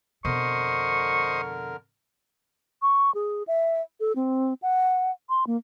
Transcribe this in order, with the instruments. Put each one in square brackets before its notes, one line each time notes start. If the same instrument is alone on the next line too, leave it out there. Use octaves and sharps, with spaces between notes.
[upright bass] F2 B2 [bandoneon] D3 A#4 [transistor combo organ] C5 D#5 [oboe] C#6
[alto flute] C#6
G#4
E5
A4
C4
F#5
C6
A#3